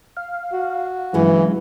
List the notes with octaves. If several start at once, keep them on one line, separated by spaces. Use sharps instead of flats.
F5
F#4
G2 C#3 E3 F#3 G#3